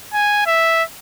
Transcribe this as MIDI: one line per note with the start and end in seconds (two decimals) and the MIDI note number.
0.14 0.43 80
0.47 0.83 76